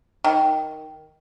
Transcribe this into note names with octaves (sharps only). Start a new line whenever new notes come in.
D#3